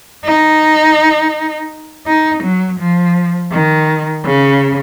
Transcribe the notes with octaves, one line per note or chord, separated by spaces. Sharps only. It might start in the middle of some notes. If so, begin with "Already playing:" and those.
D#4
D#4
F#3
F3
D#3
C#3